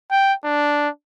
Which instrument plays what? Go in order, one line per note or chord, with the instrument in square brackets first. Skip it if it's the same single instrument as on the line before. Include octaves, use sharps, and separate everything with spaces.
[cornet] G5
D4